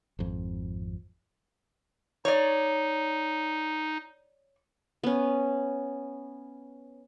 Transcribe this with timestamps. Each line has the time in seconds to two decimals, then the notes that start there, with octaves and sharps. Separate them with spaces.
0.19 G#1 F2
2.25 D#4 C#5 D5
5.04 B3 C#4